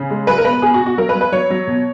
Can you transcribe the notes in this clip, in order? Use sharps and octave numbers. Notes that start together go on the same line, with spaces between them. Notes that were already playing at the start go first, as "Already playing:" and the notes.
Already playing: C#3
G#3
F#3 B4
A#4
B2 B4
B2 G#4
F#4
B2
F#4
F#3 A#4
B4
F#3
B4
F#3 C#5
F#3
B2